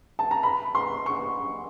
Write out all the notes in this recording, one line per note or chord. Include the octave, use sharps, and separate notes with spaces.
A5
A#5
B5
C6
C#6